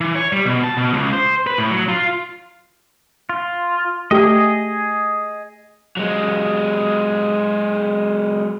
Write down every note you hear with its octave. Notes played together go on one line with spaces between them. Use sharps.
E3
C#5
G3
B2
A5
B2
C#2
C5
B4
A2
F#3
F4
F4
A3 G4 G#4 D#5
F#3 G#3